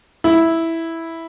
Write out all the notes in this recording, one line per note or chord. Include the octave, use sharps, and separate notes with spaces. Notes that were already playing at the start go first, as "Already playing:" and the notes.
E4